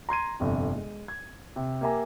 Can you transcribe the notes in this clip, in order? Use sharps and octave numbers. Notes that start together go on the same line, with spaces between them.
A#5 C6 G#6 D#7
G1 F2 C3
G#3
G#6
C3
A#3 G4 E5 G#5 A#5